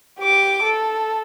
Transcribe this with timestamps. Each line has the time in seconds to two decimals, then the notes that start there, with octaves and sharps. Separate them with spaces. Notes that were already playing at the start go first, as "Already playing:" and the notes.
0.20 G4 D6
0.64 A4